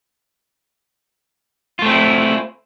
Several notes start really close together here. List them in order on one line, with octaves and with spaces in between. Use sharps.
F4 A3 C4 E4